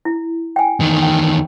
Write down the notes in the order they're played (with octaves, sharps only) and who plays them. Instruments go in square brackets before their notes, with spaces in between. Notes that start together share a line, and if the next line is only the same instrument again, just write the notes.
[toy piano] E4
G5 G#5
[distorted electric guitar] E2 D#3
[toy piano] G5